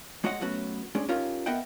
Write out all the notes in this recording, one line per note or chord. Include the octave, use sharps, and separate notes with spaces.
G#3 F#4 C#5 D#5 F#5
F#3 A3 B3 C#4 F#4
G#3 C#4 D4
C#4 D#4 F4 G4 A#4
B3 A#4 D#5 E5 F#5 G5